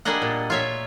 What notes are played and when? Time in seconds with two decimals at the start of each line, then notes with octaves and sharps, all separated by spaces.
0.05 G3 A#3 D4 G#4 D#5 F#5
0.22 A#2
0.50 F4 C#5 E5